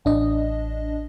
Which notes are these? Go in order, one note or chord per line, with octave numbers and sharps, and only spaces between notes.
A1 D4 D#5